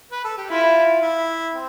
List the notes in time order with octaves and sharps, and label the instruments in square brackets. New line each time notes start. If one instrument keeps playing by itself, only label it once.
[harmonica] B4
A4
G4
[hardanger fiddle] E4 [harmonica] F4
[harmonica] E4
C4